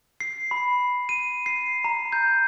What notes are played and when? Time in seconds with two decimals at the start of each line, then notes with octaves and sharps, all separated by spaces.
0.20 C7
0.51 B5
1.09 D#7
1.46 C7
1.84 A#5
2.12 G6